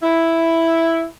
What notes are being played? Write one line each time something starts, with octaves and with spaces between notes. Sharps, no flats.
E4